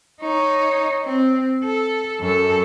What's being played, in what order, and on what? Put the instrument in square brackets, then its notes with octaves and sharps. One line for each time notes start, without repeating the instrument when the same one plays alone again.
[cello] D#4 C#5
C4
A4
F#2 A4